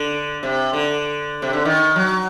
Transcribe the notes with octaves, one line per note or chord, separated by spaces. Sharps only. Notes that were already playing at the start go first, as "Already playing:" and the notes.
Already playing: D3
C3
D3
C3
D3
D#3
F#3